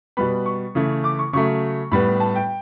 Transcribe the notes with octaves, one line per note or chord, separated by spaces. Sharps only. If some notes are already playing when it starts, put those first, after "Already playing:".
B2 G3 B3 B5
C#6
C#3 E3 A3
D6
C#6
C#3 F#3 A3 C#6
A2 G3 B3 B5
A5
G5